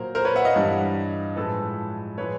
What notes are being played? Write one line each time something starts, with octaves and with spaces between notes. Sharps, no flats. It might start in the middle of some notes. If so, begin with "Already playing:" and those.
Already playing: A#2 F#3 A#3 A#4 C5
A#4 C5
B4 C#5
E5 F#5
D#5 F5
G2 E3 G3
A2 F3 G#3 A4 B4
A2 F3 G#3 B4 C#5